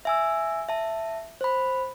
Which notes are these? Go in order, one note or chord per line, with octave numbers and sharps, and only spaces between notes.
E5 G#5 E6
E5 A5
C5 B5